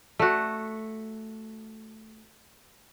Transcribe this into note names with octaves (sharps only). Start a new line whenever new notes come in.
A3 F#4